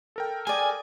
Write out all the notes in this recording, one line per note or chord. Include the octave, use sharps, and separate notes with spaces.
A4 A#4 G5
G#4 D5 G#5